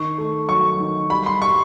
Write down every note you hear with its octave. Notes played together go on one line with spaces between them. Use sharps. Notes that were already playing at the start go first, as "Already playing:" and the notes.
Already playing: D#3 C#6
A3
F#3 C#6
D#3
G3 B5
C6
G3 C#6